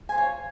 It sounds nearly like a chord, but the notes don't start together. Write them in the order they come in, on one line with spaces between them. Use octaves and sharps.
G#5 C5 F4 C#5